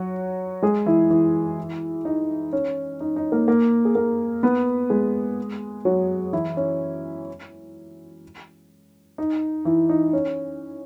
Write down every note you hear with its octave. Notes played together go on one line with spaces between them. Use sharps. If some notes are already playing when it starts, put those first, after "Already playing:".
Already playing: F#3 F#4
G#3 G#4
E3 E4
E3 E4
D#4
C#4
D#4
D#4
A#3 A#4
A#3 A#4
G#4
A#3 A#4
B3 B4
G#3 G#4
F#3 F#4
E3 E4
C#4
D#4
E3 E4
D#4
C#4